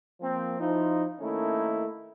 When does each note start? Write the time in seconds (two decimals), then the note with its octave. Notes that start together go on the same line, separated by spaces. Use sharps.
0.20 F3 A#3 C4
0.59 F3 D#4 E4
1.20 D#3 A3 A#3 C#4 D#4 E4